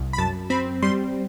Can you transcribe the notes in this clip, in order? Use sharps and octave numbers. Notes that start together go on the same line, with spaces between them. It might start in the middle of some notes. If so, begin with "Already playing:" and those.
Already playing: C2
B5
F#2 A5
C4 B5
G3 C6